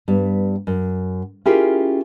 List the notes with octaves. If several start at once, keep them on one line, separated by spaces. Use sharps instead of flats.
G2 G3 B3
F#2
C#4 E4 F4 G4 G#4 A#4